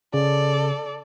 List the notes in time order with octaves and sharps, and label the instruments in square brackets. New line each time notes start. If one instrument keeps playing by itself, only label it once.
[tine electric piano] C#3 [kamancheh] A4 D5